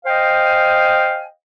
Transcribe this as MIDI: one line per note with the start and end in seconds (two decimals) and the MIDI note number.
0.06 1.25 72
0.06 1.25 75
0.06 1.25 77
0.06 1.25 79
0.06 1.25 80